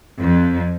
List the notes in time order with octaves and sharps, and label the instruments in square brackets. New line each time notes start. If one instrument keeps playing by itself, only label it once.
[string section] F2